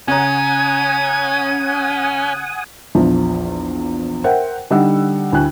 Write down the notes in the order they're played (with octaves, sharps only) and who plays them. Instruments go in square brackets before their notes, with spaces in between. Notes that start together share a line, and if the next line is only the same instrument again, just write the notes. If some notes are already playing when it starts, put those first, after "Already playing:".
[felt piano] C#3 C#5 A#5 [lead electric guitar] C#4 [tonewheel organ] F#5 G#5 D#6 [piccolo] G#6
[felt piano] A#1 E2 F3
A#4 C5 E5 F#5 G5
D3 G3 D4 D#4 F#5 E6
D2 E4 G5 G#5 F#6